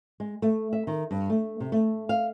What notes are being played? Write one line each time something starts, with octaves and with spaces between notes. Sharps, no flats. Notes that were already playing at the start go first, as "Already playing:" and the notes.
G#3
A3
E5
D#3
G2
A3
C3
A3
F5